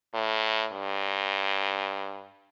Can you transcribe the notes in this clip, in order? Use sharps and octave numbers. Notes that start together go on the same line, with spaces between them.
A2
G2